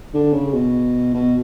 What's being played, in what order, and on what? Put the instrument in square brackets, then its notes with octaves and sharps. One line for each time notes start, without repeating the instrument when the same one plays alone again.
[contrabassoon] D3
C#3
B2
B2